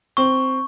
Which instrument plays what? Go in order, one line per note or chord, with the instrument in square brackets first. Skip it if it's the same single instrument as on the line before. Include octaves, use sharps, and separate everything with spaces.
[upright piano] C4 [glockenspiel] C#6